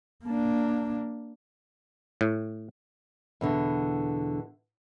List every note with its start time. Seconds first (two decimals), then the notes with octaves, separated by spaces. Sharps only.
0.25 A#3 D4
2.21 A2
3.41 E2 B2 D3